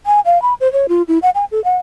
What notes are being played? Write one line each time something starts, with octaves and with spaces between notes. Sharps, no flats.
G#5
F5
B5
C5
C#5
F4
E4
F#5
G#5
A4
F#5